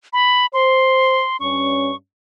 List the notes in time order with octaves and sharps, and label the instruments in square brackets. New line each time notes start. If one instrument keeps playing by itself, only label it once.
[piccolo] B5
[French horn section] C5 [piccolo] C6
[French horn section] G2 C#4 [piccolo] C#6